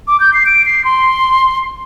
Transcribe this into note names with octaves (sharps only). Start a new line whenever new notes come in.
D6
G6
C7
D7
C7
C6